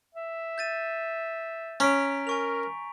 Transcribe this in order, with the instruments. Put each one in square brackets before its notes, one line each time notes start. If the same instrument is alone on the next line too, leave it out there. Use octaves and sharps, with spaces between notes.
[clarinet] E5
[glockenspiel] G6 A6 D#7
[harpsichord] C#4 [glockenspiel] A#5 B6 D7
[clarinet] A#4 [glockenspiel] G#5 C#6 F7